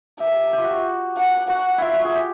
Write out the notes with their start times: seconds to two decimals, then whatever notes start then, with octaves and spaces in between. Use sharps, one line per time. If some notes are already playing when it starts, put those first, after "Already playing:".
0.20 G4 E5
0.53 G4
0.58 F4
0.64 F#4
1.17 F#5
1.49 F#4 F#5
1.78 E4 F4 E5
1.93 F#4
2.05 G#4
2.15 G4